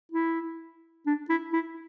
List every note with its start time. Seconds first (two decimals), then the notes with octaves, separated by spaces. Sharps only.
0.12 E4
1.06 D4
1.29 E4
1.53 E4